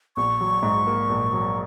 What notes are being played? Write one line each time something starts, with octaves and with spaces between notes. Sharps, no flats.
A#1 C#6
F#3
G#2
A#3
A#1
F#3